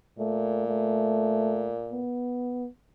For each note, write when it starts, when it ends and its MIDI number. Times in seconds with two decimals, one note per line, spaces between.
0.19 2.04 46
0.19 0.67 57
0.68 1.76 57
1.92 2.68 59